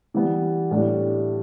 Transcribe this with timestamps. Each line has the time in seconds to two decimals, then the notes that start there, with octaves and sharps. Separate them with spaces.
0.14 E3 G3 B3
0.71 A2 G3 D4